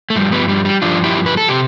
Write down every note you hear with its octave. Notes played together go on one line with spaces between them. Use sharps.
A3
G2 F3 G3
G3 B3
G3
G3
G2 F3 D4 F4
E4 G4
B4
A4
C3 G4